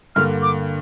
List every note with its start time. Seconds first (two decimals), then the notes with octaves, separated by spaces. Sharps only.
0.16 G2 D3 A#3 F6
0.42 D6